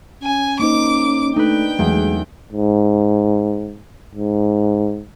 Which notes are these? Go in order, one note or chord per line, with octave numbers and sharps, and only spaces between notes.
C#4 G#5
A#3 D#4 C5 D6
A3 D4 D#4 B4 G5
E2 F#3 G#3 A3 F#5
G#2
G#2